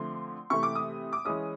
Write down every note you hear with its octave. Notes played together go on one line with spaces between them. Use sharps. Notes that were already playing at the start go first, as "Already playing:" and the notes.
Already playing: D3 F3 A3 C4 C6
C3 E3 A3 C#6
D6
D#6
D6
E3 G#3 C#4 D#6